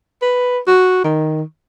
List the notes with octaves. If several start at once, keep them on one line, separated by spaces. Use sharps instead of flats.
B4
F#4
D#3